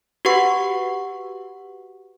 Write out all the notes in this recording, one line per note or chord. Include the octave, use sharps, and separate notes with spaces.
F#4 G4 B4 F#5 C#6